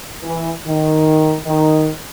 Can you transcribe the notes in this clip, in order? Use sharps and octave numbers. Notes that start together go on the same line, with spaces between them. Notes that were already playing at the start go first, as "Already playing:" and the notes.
E3
D#3
D#3